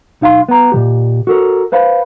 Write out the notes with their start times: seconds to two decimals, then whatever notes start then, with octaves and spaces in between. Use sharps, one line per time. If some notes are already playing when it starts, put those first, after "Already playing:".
0.21 B1 D#4 F5 A#5 C6
0.49 B3 A#5
0.72 A#2 D#3 G4
1.27 F#4 A4 A#4
1.72 B4 C5 F5 B5